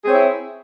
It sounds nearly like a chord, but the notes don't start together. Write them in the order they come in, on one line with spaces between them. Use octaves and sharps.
G#4 C4 C#5 E4